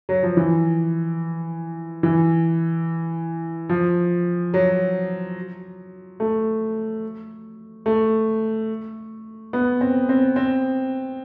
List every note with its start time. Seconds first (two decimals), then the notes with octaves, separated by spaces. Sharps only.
0.09 F#3
0.23 F3
0.37 E3
2.03 E3
3.69 F3
4.54 F#3
6.20 A3
7.86 A3
9.53 B3
9.81 C4
10.09 C4
10.36 C4